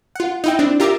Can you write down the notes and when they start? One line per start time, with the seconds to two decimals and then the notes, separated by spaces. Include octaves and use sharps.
0.15 F4 F#5
0.44 D#4 E4 G5
0.59 C4 D4 E4
0.80 F4 G4 A#4 E5 D6 E6